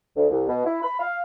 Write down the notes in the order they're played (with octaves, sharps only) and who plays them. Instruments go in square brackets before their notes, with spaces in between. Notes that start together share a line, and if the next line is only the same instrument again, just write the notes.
[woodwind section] D2
C2
B2
E4
B5
F5